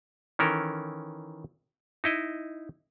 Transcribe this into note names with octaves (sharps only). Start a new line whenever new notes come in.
D#3 E3 C#4 A4 A#4
D#4 E4 D#5